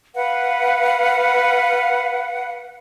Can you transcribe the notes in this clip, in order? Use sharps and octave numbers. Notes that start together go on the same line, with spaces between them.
B4 F5 F#5